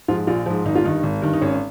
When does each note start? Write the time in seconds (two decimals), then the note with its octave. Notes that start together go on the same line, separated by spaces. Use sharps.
0.08 G#2 F3 F4
0.27 A#1 F4
0.46 G#2 F3
0.65 G#1 D#4
0.75 F4
0.84 G2 D#3 D#4
1.03 G#1
1.22 G2 D#3
1.33 D#4
1.42 G#1 C#4